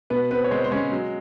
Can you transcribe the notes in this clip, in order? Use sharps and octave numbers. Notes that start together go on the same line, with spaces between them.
B2 B3 B4
B3 C4 B4
C#5
G#3 C4 C5
C5
G#3 C#4 C#5
F#3